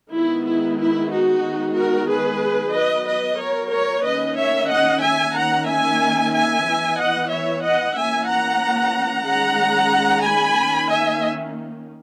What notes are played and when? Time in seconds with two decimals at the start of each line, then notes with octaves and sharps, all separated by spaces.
0.12 D#3 G#3 B3 E4
0.46 E4
0.78 E4
1.10 D#4 F#4
1.44 D#3 G#3 B3
1.75 F#4 A#4
2.08 G#4 B4
2.73 F#3 B3 B4 D#5
3.06 B4 D#5
3.39 A#4 C#5
3.72 A#4 C#5
4.04 D#3 A#3 C#4 B4 D#5
4.37 C#5 E5
4.70 D#5 F#5
5.02 E5 G#5
5.35 D#3 A#3 C#4 F#5 A#5
5.68 E5 G#5
6.33 E5 G#5
6.66 E3 B3
6.99 D#5 F#5
7.31 C#5 E5
7.63 D#5 F#5
7.96 E3 A#3 C#4 E5 G#5
8.29 F#5 A#5
9.27 D#3 G#3 C#4 F#5 A#5
10.25 G#5 B5
10.57 D#3 A#3 C#4
10.90 E5 G#5